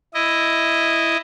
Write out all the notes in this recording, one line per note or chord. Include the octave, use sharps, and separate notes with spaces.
E4 D#5